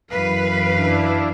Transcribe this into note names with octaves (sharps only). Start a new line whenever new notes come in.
F#2 E3 B4 F5
D4 E4